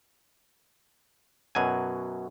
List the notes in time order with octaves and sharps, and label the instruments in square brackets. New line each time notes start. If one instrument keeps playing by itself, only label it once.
[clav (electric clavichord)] F#2 B2 F#3 G#5